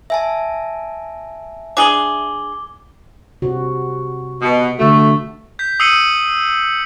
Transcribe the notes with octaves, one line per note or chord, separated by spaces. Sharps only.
E5 G#5 A5
D4 G#4 D6 G7
C3 F#4
B2
D3 A3 F#4
G6 B6
D#6 E6 C7 C#7 D#7 F#7